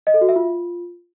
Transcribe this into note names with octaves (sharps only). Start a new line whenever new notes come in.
D#5
A4
F#4
E5
F4